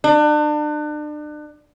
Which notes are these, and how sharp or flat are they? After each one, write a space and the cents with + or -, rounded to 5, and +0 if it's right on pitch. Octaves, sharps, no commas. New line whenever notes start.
D4 +35